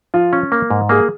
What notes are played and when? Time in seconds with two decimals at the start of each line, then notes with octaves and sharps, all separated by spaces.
0.14 F3 F4
0.33 C#4
0.52 A#3
0.70 G#2
0.89 A#3 G#4